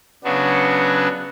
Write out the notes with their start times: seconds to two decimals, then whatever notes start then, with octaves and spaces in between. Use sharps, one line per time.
0.24 C#3 F#3 B3 D4 F#4